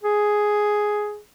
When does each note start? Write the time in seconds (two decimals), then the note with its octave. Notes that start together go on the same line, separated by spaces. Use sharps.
0.03 G#4